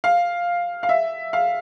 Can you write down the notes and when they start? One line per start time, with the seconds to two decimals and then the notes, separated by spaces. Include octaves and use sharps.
0.04 F5
0.83 F5
0.89 E5
1.33 F5